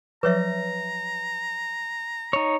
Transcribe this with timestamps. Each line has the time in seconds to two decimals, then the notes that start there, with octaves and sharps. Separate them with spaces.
0.23 F3 F#3 B4 C#5 E5 A#5
2.33 D#4 C#5